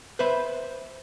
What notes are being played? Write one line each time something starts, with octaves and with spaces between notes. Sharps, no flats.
B4 C5 E5 B5